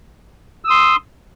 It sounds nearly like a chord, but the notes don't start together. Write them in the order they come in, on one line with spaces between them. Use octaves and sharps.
E6 D#6 C6